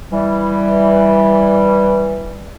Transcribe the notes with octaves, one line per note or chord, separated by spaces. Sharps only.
E3 G3